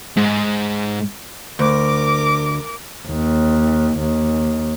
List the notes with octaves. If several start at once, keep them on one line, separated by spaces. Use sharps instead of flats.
G#2
D2 A#4 D6
D#2
D#2